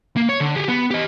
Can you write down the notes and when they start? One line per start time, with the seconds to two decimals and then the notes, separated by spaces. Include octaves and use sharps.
0.17 A#3
0.29 C#5
0.40 D3
0.55 G4 G#4
0.69 B3
0.91 G4 D#5